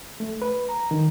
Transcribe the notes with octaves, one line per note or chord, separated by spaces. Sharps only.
A3
B4
A#5
D#3